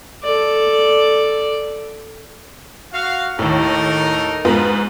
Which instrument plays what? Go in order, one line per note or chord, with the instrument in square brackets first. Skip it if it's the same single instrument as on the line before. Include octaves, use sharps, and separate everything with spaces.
[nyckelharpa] A4 D5
[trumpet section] F#4 F5
[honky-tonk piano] D#2 A2 [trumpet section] D#4 A4 A#4
[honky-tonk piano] G#2 B3 F4